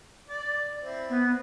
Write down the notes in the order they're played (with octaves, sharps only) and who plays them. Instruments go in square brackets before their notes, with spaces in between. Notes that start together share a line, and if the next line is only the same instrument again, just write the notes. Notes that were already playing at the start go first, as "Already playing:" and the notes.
[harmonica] D5
C4 E4
[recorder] B3